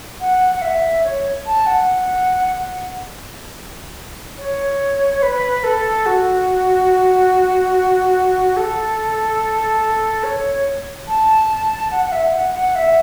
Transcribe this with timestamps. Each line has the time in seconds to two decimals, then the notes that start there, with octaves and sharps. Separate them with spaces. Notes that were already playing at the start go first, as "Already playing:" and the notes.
0.21 F#5
0.55 F#5
0.62 E5
1.04 C#5
1.46 A5
1.66 F#5
4.38 C#5
5.23 B4
5.64 A4
6.06 F#4
8.57 A4
10.24 C#5
11.08 A5
11.91 F#5
12.05 F#5
12.12 E5
12.33 F#5
12.54 F#5
12.75 E5